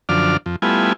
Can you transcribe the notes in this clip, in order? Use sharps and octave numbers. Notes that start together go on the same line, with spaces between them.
F#2 D3 F3 D5 F6
F2
G3 A3 B3 E4 F4 G#5